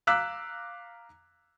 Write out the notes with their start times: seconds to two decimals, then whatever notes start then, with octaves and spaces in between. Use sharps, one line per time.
0.07 F5 A#5 D6 E6 F#6 B6